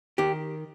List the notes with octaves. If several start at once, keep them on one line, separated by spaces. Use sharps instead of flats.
D#3 G4